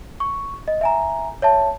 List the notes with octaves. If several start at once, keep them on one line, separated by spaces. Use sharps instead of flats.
C#6
D#5
E5 G#5 A#5
C#5 E5 A5